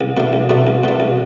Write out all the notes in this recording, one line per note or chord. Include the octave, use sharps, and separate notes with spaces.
C2
B2 A3 D4
C2
B2 A3 D4
C2
B2 A3 D4
C2